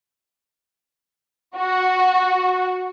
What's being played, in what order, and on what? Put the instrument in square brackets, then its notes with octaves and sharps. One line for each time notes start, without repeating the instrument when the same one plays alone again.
[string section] F#4